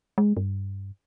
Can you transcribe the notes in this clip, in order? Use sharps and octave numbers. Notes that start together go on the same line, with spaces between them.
G#3
G2